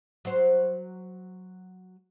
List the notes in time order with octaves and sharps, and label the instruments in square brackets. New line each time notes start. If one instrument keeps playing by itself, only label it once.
[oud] F#3 C5